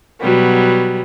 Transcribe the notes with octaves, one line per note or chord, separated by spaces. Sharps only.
B2 F#3 G3 B3